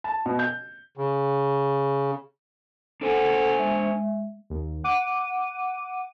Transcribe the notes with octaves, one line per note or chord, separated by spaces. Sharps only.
A5
B2
G6
C#3
D4 A4 C5 F#5 G#5
G#3 E5
D#2
F#5 D6 D#7